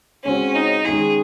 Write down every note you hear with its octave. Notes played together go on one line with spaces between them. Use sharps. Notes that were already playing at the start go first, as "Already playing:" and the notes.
C#3 G#3 C4 C#4 F#4
D#4
D#3 G#3 C#4 G#4